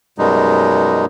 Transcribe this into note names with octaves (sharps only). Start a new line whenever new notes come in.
F#2 B2 G3 G#3 D#4